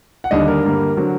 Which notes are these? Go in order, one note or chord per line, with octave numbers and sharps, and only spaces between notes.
F#5
D#2 D3 G3 D4 D#5
A#4
G2 D3 G3 A#3
D3 F#3 C4